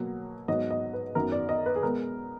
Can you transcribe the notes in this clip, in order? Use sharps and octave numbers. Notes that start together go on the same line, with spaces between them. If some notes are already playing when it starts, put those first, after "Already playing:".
Already playing: B2 F#3 A#3
G#2 F#3 B3 D#5
D#5
B4
F#2 D#3 F#3 B3 A#4
D5
D#5
B4
G#4
B2 G#3 B3 A#4